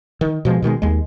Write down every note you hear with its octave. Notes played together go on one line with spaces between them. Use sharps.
D#3
B2 F3 F#3 G#3
B2 D#3 F#3 G#3
D#2 G#3